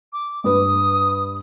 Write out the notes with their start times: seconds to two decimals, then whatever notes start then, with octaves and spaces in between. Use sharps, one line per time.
0.13 D6
0.44 G2 B4 D#6